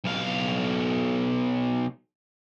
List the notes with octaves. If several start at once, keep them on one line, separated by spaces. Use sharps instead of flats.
B1 F5